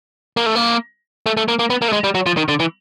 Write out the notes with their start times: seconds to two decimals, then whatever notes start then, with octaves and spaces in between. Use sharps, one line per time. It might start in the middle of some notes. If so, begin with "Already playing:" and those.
0.37 A#3
0.46 A3
0.55 A#3
1.26 A3
1.37 A3
1.48 A#3
1.59 A#3
1.70 B3
1.82 A#3
1.88 A3
1.93 G#3
2.04 G3
2.15 F#3
2.26 F3
2.37 D#3
2.48 D3
2.60 E3